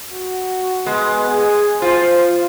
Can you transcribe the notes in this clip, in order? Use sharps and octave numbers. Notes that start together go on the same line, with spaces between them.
F#4
G#3 B3
G#4
F4 C5